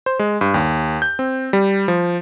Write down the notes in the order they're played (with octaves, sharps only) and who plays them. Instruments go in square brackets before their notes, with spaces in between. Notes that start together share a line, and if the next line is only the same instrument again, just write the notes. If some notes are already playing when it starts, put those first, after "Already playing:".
[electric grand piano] C5
G#3
G2
D#2
G6
C4
G3
F3